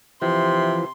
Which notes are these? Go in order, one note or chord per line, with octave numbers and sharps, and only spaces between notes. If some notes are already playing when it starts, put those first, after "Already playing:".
C3 E3 F3 C6